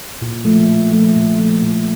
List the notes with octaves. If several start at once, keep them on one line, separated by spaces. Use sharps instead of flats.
A#2
F3 A3
A#2
F3 A3
A#2
F3 A3
A#2